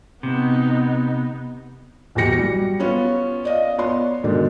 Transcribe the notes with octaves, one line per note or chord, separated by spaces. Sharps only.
C3 B3 D#4
D#1 B1 E3 G4 A#6 C#7
F#3 G3
B3 C#4 F4
D5 D#5 F5
B3 F4 C#5 D5 C6
G#2 B2 D3 D#3 D4